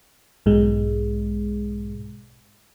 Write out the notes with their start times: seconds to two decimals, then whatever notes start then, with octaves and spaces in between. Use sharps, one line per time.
0.46 B1 G#2 B2 G#3